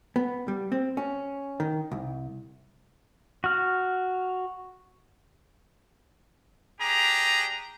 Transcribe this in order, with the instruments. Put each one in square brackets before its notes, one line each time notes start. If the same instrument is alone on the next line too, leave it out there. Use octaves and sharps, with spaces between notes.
[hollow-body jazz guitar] B3
G3
C4
C#4
D#3
C2
[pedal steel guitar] F#4 F6
[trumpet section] D4 G4 G#4 A#5